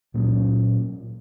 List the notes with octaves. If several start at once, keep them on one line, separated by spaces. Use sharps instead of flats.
A#2 F#3 A#3 C#4